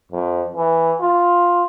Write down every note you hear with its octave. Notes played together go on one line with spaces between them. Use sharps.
F2
E3
F4